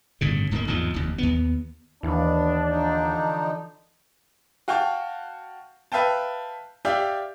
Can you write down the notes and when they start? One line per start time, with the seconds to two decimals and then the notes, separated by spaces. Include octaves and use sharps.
0.21 G1 A2 C#3
0.51 D1 G#2 G#3 A#3
0.67 G#1 E2 D#3 F3
0.94 F1 D#2
1.18 D#2 B3
2.03 D#2 E3 B3 D4
2.69 D3 F3 D#4
4.68 F#4 F5 G5 A5 C#6
5.92 B4 E5 F5 G5 A5
6.85 G4 D5 E5 F5 G5